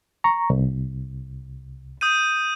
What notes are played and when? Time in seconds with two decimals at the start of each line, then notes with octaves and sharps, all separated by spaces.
0.24 A#5 C#6
0.50 C2
2.01 D#6 G6 D#7